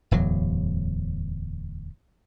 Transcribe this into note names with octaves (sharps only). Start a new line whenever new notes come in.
D1 E2 F#3